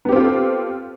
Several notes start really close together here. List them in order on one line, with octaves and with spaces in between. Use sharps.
B3 G4 C4 F4 A4